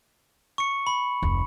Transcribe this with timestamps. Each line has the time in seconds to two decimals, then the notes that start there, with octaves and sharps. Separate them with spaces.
0.58 C#6 C#7
0.87 B5
1.22 F1 D2